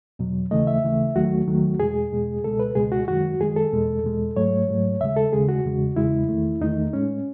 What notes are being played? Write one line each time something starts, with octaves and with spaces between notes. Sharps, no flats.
E2 B2 F#3
D#2 C#3 E3 A3 D#5
E5
D#2 C#3 E3 A3
D#2 D#3 F#3 A3 F#4
D#2 D#3 F#3 A3
E2 B2 G#3 G#4
E2 B2 G#3
C#2 B2 G#3 A4
B4
C#2 B2 G#3 G#4
F#4
F#2 D#3 G#3 F#4
F#2 D#3 G#3 G#4
A4
E2 B2 G#3
E2 B2 G#3
G#2 F#3 A3 C#5
G#2 F#3 A3
D#2 C#3 G#3 E5
A4
D#2 C#3 G#3 G#4
F#4
E2 C#3 G#3
E2 C#3 G#3 E4
E2 D#3 A3
E2 D#3 A3 D#4
A2 G#3 C#4